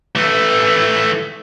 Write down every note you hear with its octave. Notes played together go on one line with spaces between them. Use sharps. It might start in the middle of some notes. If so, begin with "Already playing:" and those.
E3 A3